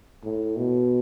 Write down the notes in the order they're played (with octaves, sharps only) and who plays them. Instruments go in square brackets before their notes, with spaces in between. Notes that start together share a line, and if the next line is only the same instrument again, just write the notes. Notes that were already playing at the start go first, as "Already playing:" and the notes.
[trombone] A2
B2